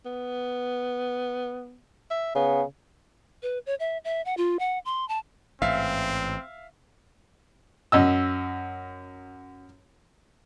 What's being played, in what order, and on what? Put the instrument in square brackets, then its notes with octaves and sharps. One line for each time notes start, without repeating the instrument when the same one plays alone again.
[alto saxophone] B3
E5
[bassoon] C#3 [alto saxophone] B3
[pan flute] B4
C#5
E5
E5
F#5
F4
F#5
C6
A5
[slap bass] A1 G#2 [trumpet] C4 [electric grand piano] E5 F5
[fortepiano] F#2 D#5 E6